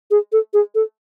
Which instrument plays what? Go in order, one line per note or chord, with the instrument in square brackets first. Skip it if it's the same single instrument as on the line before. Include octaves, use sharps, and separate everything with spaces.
[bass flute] G#4
A4
G#4
A4